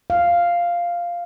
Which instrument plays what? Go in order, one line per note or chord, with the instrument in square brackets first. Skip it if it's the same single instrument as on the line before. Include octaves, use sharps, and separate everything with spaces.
[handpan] F5